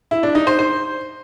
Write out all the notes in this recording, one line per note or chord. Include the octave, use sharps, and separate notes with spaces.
E4
D4
D#4
C5
C5